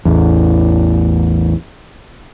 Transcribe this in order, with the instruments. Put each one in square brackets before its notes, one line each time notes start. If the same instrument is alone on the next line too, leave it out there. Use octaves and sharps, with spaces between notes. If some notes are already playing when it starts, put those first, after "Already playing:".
[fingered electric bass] A1 E2